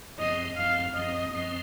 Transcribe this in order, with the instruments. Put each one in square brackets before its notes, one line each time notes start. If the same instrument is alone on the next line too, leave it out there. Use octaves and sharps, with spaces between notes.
[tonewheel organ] F#2 F3 C4 [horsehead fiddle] D#5
[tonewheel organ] F#2 F3 C4 [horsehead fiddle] F5
[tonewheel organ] F#2 F3 C4 [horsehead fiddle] D#5
[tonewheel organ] F#2 F3 C4